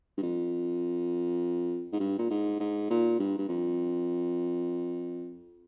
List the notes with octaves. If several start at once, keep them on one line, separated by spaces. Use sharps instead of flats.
G2
F2
G#2
G2
A#2
G#2
G#2
A#2
G2
G2
F2